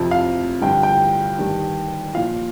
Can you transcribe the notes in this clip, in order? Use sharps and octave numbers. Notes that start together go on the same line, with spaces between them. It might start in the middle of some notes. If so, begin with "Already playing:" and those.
Already playing: F2 C3 F3
F5
G2 D3 F3 G5
G5
G2 D#3 G3
A#2 F3 F5